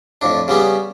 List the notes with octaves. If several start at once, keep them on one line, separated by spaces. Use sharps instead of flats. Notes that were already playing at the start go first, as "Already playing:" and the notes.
F2 A2 D4
C#3 G3 B3 C#4